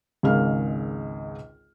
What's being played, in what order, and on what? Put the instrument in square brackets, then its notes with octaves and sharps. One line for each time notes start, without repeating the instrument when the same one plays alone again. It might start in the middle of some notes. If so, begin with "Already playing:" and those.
[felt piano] G#1 C#2 G#3 A#4 F5 F6